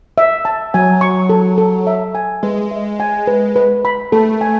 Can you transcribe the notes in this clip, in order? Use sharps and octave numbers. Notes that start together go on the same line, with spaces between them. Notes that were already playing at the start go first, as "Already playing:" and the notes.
E5
A5
F#3 G#5
C#6
A4
A4
E5
G#5
G#3 B4
E5
G#5
B4
B4
B5
A3 A4
G#5